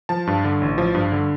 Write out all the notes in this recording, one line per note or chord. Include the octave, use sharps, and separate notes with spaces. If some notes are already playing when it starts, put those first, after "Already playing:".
F3 A5
G2
D3
A1
F3
G2
D3